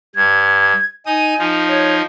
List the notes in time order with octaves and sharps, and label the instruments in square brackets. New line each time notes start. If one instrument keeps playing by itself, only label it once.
[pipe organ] G2 [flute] G#6
[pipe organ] D#4 D#6 [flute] G#5
[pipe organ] F3 D#4
[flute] C#5